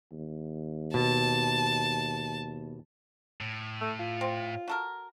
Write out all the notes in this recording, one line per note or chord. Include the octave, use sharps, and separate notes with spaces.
D#2
B2 A5
A2
A3
F4
C4
F#4 A4 A#4